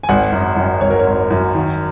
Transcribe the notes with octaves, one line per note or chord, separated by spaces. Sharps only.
G#5
G#1 F#5
F#2
F#2
G#1 C#5
A#4
C#5
G#1
F#2
D#3